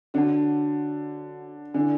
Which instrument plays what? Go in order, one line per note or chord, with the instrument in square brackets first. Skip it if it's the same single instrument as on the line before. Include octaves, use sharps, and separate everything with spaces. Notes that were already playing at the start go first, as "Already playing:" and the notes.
[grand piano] D3 [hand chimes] F#4 C#5 F#5 A5
[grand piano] D3 [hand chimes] E4 A4 D5 G#5